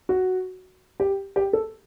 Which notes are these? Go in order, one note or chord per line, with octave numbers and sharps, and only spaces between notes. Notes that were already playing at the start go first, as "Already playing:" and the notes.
F#4
G4
G4
A4